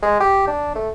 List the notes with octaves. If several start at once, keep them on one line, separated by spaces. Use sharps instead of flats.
G#3
G4
D4
A3